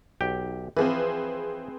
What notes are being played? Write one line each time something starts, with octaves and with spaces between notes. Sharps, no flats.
B1 G4 G5
E3 F3 C4 G#4 B4